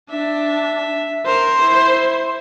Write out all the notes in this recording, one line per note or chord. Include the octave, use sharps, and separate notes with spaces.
D4 E5
A#4 C5
E4